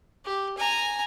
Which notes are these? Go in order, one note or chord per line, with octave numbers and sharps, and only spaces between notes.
G4
G#5 A#5